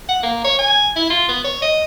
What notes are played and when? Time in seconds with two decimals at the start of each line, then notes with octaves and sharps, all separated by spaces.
0.08 F#5
0.23 A#3
0.44 C#5
0.59 G#5
0.96 E4
1.10 F4
1.28 B3
1.44 C#5
1.62 D#5